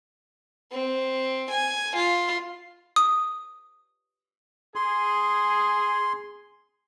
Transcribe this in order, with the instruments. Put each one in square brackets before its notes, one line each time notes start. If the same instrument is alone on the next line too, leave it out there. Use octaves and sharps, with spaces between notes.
[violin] C4
G#5
F4
[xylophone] D#6
[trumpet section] G#4 [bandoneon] C6